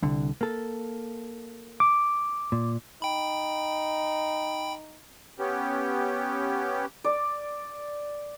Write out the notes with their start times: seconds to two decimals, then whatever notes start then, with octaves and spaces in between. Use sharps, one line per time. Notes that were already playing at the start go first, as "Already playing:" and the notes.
0.03 C2 D3
0.41 A#3 A4
1.80 D6
2.52 A#2
3.02 D#4 G5 B5
5.39 B3 C#4 G4
7.04 D5